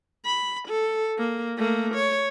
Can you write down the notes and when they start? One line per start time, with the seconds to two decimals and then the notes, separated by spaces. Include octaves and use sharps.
0.25 B5
0.68 A4
1.18 A#3
1.57 A3 A#3
1.94 C#5